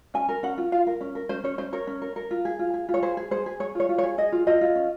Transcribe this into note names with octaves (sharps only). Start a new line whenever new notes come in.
C#4 G#5
A#4
C#4 F#5
F4
F4 F5
A#4
C#4
A#4
C#4 C5
C#4 C#5
C#4 C5
A#4 C#5
C#4
A#4
A#4
F4
G#4
F4
G#4
F4
C#5
G#4 C5
G#4
G#4 C5
G#4
G#4 C#5
F4 C#5
F4
C#5
G#4
G#4 D#5
F4
F4 D#5
F4
C#4